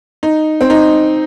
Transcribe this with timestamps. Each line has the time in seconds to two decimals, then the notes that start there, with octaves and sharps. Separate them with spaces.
0.23 D#4
0.61 C4
0.70 D#4